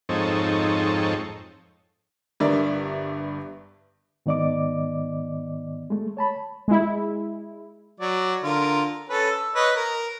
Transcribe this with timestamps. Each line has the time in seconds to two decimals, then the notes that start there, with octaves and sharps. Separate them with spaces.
0.09 F2 G#2 C4 D#4 A4 C#5
2.40 G1 G2 A#4 D5 E5
4.26 G#2 D#3 B3 D5 D#5 D6
5.90 G#3 A3
6.17 C#5 A5 B5
6.68 G#3 E4
8.00 F#3 D5
8.43 D3 F4 A#4
9.09 C#4 A4 B4
9.31 E6
9.55 B4 C#5 D#5
9.76 A#4